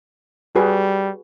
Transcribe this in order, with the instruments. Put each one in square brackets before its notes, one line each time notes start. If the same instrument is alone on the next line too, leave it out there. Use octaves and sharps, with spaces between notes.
[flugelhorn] G3 [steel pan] F#4 G#4 B4